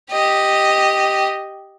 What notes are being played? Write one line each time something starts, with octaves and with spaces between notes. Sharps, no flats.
G4 D#5